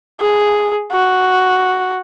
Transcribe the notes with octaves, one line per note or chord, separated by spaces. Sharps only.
G#4
F#4